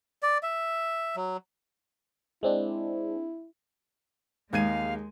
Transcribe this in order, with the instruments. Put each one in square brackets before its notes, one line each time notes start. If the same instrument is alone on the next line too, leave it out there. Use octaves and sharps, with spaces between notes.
[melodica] D5
E5
F#3
[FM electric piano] G#3 C4 D4 [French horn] E4
[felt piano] D#2 G#6 D#7 [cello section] G#3 [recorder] F5